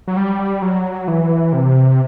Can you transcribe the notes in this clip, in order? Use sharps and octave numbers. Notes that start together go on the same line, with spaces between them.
F#3
G3
F#3
E3
C3